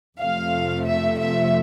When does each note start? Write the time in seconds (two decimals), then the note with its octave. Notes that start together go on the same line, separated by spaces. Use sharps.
0.19 F2 C3 F3 A3 F5
0.86 E5
1.19 E5